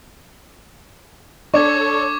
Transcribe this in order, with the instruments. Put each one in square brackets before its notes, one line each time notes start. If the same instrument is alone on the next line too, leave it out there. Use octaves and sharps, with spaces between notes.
[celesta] D4 [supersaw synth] A4 C#5 [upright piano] D5 [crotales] C#6 D6 G#6